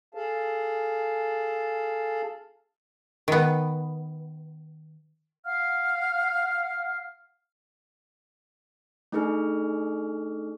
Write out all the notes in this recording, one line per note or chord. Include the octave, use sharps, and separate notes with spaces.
G#4 A4 F5 A5
D#3 B3
F5 F#5 F6
A3 D4 D#4 G#4 A4 F6